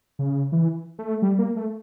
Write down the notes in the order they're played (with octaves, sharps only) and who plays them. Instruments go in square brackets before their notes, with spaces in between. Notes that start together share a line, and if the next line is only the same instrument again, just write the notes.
[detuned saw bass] C#3
E3
A3
G3
A#3
A3